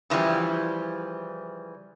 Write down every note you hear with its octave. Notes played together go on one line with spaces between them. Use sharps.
C#3 E3 F3 G3